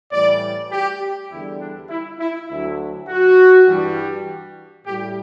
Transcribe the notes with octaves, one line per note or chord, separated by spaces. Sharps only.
A2 E3 G3 D5
G4
E2 D3 G3 E4
D4
E4
E4
D2 D3 F#3 E4
F#4
G2 E3 G3
A2 G3 G4